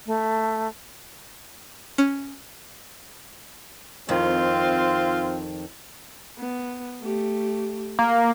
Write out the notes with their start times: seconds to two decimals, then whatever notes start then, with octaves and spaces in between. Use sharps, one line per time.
0.07 A3
1.98 C#4
4.09 F2 D#3 C4 F4
6.38 B3
7.02 A3 G4
7.99 A#3